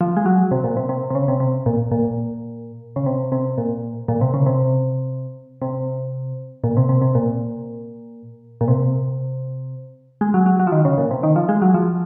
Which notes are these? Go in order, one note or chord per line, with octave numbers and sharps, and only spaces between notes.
F3
G#3
F#3
C3
A#2
C3
C3
C3
C#3
C3
C3
A#2
A#2
C#3
C3
C3
A#2
A#2
C3
C#3
C3
C3
A#2
C3
C3
C3
A#2
A#2
C3
G#3
F#3
F#3
F#3
F3
D#3
C#3
A#2
C3
D#3
F3
G#3
F#3
F3